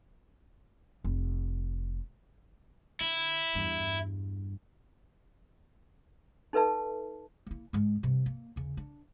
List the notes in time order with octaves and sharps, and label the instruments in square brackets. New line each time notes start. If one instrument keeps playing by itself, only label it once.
[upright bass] F1
[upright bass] D3 [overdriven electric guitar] E4
[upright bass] E2 G2
[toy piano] D#4 A4 B4 E5 A5
[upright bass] A#3 E4
G#2 G#3
G2 C3
A#3
D#2 C#3
D4